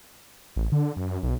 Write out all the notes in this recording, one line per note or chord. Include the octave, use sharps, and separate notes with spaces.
A1
D3
F#2
B1